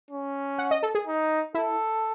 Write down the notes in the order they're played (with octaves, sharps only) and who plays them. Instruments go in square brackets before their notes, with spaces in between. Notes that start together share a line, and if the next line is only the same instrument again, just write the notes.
[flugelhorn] C#4
[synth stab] F#5
D#5
A4
G#4
[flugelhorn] D#4
[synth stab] E4 [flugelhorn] A4